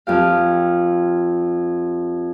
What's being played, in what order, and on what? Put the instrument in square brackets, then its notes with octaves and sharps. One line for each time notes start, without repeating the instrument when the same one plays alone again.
[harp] F2 G4 F5